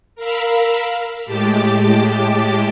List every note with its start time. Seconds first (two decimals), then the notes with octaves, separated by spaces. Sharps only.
0.15 A#4 F5 B5 E6
1.25 A2 G#3 G4 A5 D6